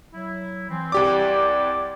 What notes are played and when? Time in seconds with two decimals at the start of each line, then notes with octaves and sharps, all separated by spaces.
0.12 F#3 E4
0.69 E3 C4
0.92 C2 G4 D5 D6